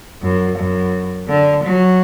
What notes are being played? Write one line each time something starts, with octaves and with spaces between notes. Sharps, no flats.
F#2
F#2
D3
F#3